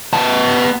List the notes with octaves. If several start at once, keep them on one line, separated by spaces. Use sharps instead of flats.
B3 A5